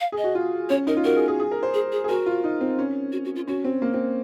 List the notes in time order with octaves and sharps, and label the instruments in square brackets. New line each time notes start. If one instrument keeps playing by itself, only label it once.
[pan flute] F5
[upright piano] G#4
[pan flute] D#5
[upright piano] F#4
F4
[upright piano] C#4 [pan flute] C#5
[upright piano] D#4 [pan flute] A#4
[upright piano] F4
[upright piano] F#4 [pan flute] A#4
[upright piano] G#4
G#4
G#4
A#4
C5
[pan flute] G#4
G#4
[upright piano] G#4
[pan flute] F#4 [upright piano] A#4
[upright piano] F4
D#4
C4
C#4
[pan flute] F#4
F#4
F4
[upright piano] C#4 [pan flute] F#4
[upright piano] C4
A#3
C4